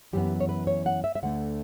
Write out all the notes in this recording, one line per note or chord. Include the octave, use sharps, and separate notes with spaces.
F#2 E3 B3 G4
C#5
B4
C#5
F#5
E5
E5
D2 D3 A3 F#5